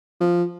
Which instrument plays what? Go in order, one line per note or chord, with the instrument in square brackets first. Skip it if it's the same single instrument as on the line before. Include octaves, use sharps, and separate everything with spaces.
[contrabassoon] F3